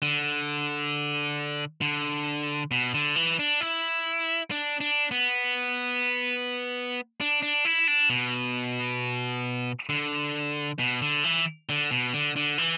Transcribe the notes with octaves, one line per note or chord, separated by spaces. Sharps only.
D3
D3
B2
D3
E3
D4
E4
D4
D4
B3
D4
D4
E4
D4
B2
D3
B2
D3
E3
D3
B2
D3
D3
E3